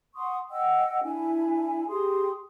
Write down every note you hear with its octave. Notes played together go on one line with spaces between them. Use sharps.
F#5 C6 C#6 D#6
D#5 F#5 G5 E6
D4 E4 G#5
G4 G#4 C6 D#6